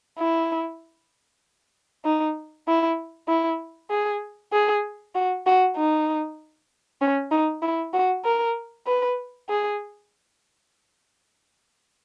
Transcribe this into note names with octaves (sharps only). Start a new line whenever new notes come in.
E4
D#4
E4
E4
G#4
G#4
F#4
F#4
D#4
C#4
D#4
E4
F#4
A#4
B4
G#4